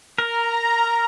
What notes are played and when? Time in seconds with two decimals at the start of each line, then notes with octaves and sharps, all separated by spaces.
0.18 A#4 A#5